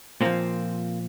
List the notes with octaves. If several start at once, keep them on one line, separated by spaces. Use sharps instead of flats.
A#2 F3 A#3 C4